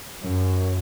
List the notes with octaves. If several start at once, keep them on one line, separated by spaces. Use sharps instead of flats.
F#2